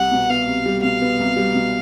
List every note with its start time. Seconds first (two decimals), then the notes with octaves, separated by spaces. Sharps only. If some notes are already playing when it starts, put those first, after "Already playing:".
Already playing: C2 G3 F#5
0.12 B2
0.30 B3 F5
0.47 C2
0.66 G3
0.83 B2 F5
1.02 B3
1.20 C2
1.36 G3
1.54 B2